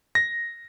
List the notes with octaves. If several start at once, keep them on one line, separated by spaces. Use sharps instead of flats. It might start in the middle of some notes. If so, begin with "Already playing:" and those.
A#6